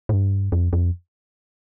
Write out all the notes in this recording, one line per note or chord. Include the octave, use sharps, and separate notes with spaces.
A2
G2
F2
F2